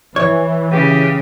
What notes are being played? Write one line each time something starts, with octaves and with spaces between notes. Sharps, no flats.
E3 C#5
C#3 G4